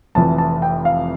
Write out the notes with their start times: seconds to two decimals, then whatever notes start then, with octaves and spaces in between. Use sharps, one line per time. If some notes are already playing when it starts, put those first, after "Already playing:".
0.15 F1 F2 E3 A5
0.38 A5
0.62 G5
0.85 F5